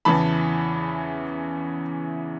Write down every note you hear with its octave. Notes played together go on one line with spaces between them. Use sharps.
E2 C#3 E3 A5 B5